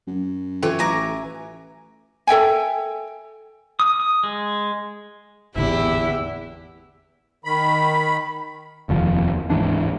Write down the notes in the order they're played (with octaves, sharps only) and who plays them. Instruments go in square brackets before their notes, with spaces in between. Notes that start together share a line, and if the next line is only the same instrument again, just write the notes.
[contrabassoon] F#2
[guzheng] E3 C#5 [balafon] F4 A4 G5
[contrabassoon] A1 [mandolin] G#5 A#5 D6
[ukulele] A4 E5 G5 G#5
[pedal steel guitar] D#6
D#6
G#3
[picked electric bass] G#1 A2 D3 [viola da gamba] E2 G4 [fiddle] E4 [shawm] E5
[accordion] D#3 B5
[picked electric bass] F1 D#2 F3
D1 G#2 E3 D4